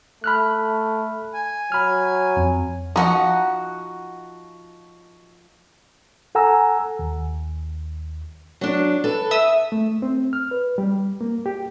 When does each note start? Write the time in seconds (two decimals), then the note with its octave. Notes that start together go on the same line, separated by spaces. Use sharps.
0.24 A3 B5 F6 F#6
1.34 G#5
1.72 F#3 B5 F6
2.37 F2
2.96 F3 D#4 F#4 F#5
6.35 A4 F#5 G#5 A#5 E6
6.99 D#2
8.61 F#3 D4
9.04 A4 B4
9.31 E5 D#6 E6
9.72 A3
10.02 C4
10.33 F6
10.51 B4
10.78 G3
11.21 A#3
11.46 G4